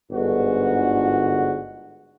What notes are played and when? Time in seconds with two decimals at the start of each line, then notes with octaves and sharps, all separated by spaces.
0.11 G1 G#2 D3 F#4